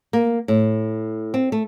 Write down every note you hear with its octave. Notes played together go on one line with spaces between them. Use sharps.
A#3
A2
C4
A3